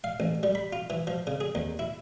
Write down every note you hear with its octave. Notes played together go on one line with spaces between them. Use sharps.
F5
A1
G3
B5
F4
E3
F3
C#3
G#4
D#2
E4